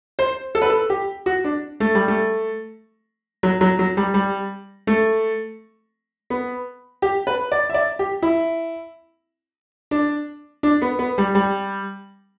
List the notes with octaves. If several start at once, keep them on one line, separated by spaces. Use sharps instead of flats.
C5
A4
B4
A4
G4
F#4
D4
A3
G3
A3
F#3
F#3
F#3
G3
G3
A3
B3
G4
B4
D5
E5
D5
G4
E4
D4
D4
B3
B3
G3
G3